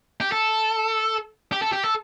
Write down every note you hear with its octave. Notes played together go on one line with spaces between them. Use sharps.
G4
A4
G4
A4
G4
A4